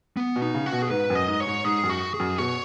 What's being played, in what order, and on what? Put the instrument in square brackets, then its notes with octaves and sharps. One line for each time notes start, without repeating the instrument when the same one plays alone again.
[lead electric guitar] B3
[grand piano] B2
[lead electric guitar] D#4
[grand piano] C#3
[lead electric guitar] F#4
[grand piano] B2
[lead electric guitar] G#4
[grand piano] G#2 [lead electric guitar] B4
[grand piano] F#2
[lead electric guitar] D#5
[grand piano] G#2
[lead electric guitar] C#5
[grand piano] G#2
[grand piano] G#2 [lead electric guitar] G#4
[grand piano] F#2
[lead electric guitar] F#4
G#4
[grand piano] F#2
[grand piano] B2 [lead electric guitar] C#5